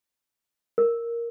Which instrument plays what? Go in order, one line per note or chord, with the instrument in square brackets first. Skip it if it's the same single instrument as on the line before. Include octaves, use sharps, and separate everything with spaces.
[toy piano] A#4